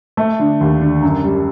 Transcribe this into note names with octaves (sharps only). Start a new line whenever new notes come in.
A3
D3
D#2
D3
F#2
G3